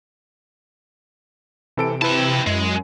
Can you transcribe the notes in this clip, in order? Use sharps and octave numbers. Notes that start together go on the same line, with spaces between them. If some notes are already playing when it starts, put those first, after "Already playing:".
C3 E3 A4 D7
C4 E4 B4 A5
F#2 G#3